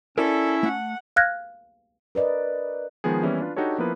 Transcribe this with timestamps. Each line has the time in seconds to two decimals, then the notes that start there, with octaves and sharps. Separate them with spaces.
0.18 C#4 E4 A4 A#4 D5 G#5
0.63 A3 F#5
1.16 F5 F6 F#6 G#6 A#6
2.15 A#4 B4 D5 D#5
3.04 D#3 F3 G#3 B3 G#4
3.23 E3 G3 A#3 B3 C#4 E4
3.40 D4 F4 B4
3.56 D4 D#4 F#4 G4 A4 C#5
3.78 F3 A#3 B3 E4 A#4 B4